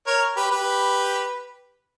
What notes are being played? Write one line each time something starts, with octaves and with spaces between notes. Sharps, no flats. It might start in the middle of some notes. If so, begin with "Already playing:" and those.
A#4 C#5
G4 B4
G4 B4